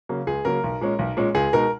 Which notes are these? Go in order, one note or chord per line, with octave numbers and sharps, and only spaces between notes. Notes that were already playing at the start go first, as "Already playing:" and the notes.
C#3 F#3 A#3
C#2 G#4
C#3 F#3 A#3 A#4
B1
A#2 G#3 C#4
B1
A#2 G#3 C#4
C#2 G#4
B2 G#3 D#4 A#4